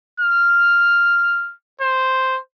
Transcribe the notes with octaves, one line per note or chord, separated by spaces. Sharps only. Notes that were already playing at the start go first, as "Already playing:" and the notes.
F6
C5